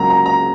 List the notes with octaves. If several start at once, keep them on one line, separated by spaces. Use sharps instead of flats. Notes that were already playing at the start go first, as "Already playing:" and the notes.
Already playing: C#2 C#3 F#3 A#3 A#5
A#5
A#5